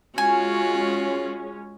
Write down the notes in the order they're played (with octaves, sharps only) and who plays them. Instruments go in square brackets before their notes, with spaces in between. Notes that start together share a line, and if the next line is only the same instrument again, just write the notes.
[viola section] G#3 C#4 [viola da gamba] F4 F#4 [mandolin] G#5